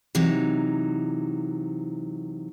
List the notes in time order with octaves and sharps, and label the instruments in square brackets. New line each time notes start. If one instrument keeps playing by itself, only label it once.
[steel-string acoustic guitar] C3 E3 F#3 D#4